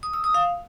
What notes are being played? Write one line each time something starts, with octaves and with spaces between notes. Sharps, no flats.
D#6
E6
D#6
F5